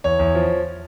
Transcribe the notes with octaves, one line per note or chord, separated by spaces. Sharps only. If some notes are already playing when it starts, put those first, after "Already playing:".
E2 C#5
E2
F3